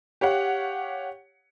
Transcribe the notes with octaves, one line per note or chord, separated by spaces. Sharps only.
G4 C#5 F5 F#5